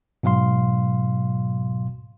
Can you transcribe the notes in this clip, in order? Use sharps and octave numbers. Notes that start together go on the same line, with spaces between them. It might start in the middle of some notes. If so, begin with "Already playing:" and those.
G#2 B2 F#3 F5 C6